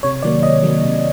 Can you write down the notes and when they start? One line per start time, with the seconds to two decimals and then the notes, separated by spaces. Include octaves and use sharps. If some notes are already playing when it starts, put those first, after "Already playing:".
0.03 C3 C#5
0.23 D#3 F#3 A#3 D5
0.43 C3 D#5
0.63 D#3 F#3 A#3
0.82 C3